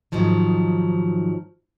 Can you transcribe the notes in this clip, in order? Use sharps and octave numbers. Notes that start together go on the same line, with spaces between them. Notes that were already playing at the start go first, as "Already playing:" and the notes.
G#2 D#3 F3 F#3